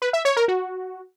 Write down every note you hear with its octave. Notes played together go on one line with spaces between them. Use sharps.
B4
E5
C#5
A#4
F#4